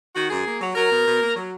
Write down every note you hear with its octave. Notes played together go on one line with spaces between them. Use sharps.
D#3 F#4
F#2 G#4
A#3
F#3
F#3 A#4
B2
B2
A#3
F#3